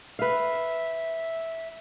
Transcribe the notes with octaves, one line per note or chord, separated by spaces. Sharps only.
B4 E5 F5